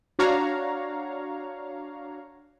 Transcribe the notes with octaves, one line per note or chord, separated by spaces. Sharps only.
D4 F#4 C#5 F5 A#5